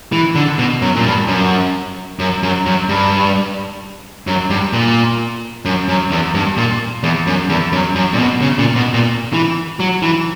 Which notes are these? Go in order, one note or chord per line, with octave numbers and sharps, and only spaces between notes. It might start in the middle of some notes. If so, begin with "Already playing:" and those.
E3
D3
B2
F#2
A#2
G2
F#2
F#2
F#2
F#2
G2
F#2
G2
A#2
F#2
F#2
E2
G2
A#2
E2
F#2
E2
F#2
F#2
A#2
B2
C#3
A#2
B2
A#2
E3
F#3
E3